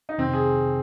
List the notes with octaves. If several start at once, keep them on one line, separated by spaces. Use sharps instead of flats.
D#4
F2 C3 D#3 C4
G#4